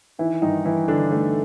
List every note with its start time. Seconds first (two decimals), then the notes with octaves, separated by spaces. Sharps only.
0.19 D#3 E3 E4
0.42 G2 D#3 D#4
0.65 G2 E3 E4
0.88 D3 D#3 D4
1.11 D#3 A3